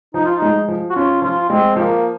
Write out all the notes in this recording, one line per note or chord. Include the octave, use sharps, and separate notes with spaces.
F3 D#4
F4
D#4
G#3
F3
F#4
C#4 F4
F3 F4
G#3 C4
F3 A#3